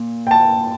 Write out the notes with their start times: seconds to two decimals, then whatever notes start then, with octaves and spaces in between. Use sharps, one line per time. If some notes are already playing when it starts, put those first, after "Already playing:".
Already playing: A#2
0.27 G5
0.31 A5